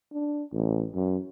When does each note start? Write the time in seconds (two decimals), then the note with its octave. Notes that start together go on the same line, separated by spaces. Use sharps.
0.13 D4
0.52 A1
0.94 F#2